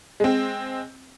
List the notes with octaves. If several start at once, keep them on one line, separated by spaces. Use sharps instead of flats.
G#3 C4